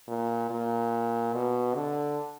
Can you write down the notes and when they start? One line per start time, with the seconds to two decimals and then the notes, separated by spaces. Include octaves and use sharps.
0.08 A#2
0.50 A#2
1.33 B2
1.75 D3